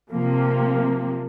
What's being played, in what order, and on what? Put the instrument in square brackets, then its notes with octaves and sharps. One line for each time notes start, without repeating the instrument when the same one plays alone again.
[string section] C3 F3 A#3